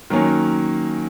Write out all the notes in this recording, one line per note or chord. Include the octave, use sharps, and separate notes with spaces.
D#3 F#3 A#3 C#4